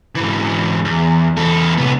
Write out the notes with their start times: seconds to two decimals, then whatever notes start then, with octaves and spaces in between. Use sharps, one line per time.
0.15 G#2 E3
0.85 E2
1.37 E2 A4
1.77 C2 B3